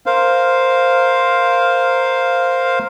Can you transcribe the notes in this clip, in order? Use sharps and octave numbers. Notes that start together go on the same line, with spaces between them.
A#4 C5 F5